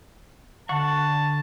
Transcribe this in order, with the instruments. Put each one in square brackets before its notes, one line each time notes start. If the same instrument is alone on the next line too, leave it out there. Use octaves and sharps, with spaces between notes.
[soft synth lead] D3 [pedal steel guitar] F#5 C#6 [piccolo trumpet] A5